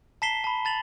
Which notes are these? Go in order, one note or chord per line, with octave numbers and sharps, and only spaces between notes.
A5 A#5 B6 C7 E7 G7
A5 B5
A5 A6 F7 F#7